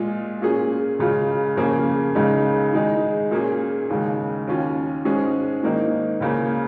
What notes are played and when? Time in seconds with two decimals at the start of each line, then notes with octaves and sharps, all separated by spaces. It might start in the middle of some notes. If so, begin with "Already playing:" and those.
Already playing: A#2 G#3 F4 G#4
0.42 A#2 A#3 C#4 F4 G#4
0.99 C#2 C#3 G#3 F4
1.57 F2 C#3 A#3 C#4 G#4
2.15 C#2 C#3 G#3 D#4
2.73 D#3 G#3 D#4 G#4
3.31 A#2 A#3 C#4 G#4
3.89 D#2 C#3 G#3
4.47 D#2 D#3 C#4 F4
5.05 G#2 G#3 C#4 G#4
5.63 G#2 D#3 A#3 D#4
6.20 C#2 C#3 A#3